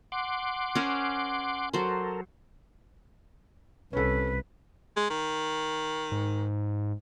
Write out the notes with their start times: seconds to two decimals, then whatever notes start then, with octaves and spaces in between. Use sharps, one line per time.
0.12 F#5 C6 D6
0.75 C#4 A#4 C5
1.73 F#3 A4 A#4 C5
3.93 C2 C#4 A4 B4
4.96 G#3
5.10 D#3
6.12 G#2